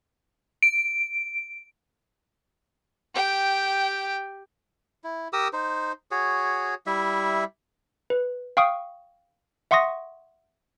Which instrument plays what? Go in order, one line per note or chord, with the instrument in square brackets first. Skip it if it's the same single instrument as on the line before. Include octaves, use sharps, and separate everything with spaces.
[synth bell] D7
[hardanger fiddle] G4 G5
[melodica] E4
G4 A#4 D#6 E6
D#4 C5
F#4 G#4 C#5
G3 E4 E5
[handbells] B4
F5 G5 C#6 D#6
E5 F#5 C6 C#6 D#6 A#6